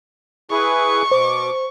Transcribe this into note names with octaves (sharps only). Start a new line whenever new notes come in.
E4 G#4 B4 C#6
B2 C5 D6